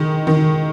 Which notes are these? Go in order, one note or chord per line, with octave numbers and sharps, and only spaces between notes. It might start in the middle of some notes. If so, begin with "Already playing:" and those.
Already playing: D#3 G#3
D#3